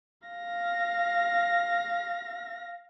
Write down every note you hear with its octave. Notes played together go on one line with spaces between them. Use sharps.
F5 A#6